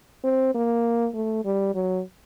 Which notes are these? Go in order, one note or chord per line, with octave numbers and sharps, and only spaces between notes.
C4
A#3
A3
G3
F#3